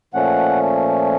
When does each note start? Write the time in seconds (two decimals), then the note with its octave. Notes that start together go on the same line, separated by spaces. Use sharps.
0.14 A#2 F3 A3 C#4 F#5